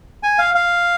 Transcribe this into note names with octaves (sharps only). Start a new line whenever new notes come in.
G#5
F5
F5